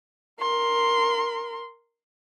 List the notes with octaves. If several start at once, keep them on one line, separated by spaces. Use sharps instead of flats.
A#4 C6